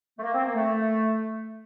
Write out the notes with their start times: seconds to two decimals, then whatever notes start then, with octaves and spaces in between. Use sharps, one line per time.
0.18 A3
0.22 A#3
0.33 C4
0.44 A#3
0.54 A3